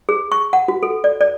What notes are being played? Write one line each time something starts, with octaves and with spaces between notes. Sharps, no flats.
G#4
C#6
F#5
F#4
A4
D5
D5